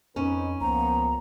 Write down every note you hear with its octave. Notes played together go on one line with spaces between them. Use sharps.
F2 C4 C#4 D#4 B4
C#2 F3 A#3 B3 A#5